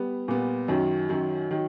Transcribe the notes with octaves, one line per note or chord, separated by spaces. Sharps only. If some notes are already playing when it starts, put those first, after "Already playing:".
Already playing: G3 B3
A#2 G3 B3
F#2 D#3 F#3
F#2 D#3 F#3
D#3 F#3